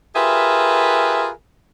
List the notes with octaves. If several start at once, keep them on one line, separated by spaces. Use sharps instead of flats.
F4 G4 G#4 A#4 B4 E5